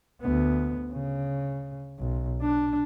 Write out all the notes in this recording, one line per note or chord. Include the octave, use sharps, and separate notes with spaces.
D2 B3
C#3
B1
D4